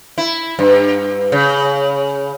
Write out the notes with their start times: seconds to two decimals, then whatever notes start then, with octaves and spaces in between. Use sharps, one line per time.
0.18 E4
0.59 G2
1.32 C#3